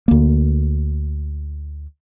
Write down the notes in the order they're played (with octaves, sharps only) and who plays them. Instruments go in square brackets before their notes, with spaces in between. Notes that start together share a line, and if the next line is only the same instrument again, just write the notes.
[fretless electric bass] D2 A#3